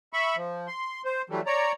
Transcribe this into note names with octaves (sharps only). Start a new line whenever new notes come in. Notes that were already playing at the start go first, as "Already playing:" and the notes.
E5 B5 C#6
F3
C6
C5
E3 F#3 G3 A3
C#5 D5 A#5